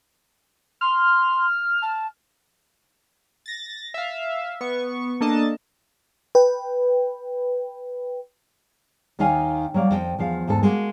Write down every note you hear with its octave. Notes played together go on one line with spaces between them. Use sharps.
C6 F6
A5
A6 A#6
E5 F5
B3 C#6
A#3 D4 A4 D#5 A5
B4 G5
D#2 D#3 D#4 D#5 F5 G#5
F#3 G3 A#3
F2 G5
E2 F3 F5
E2 G#2 A4
G#3 A#3 F#4